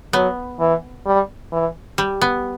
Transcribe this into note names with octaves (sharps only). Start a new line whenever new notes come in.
F#3 B3
E3
G3
E3
G3
B3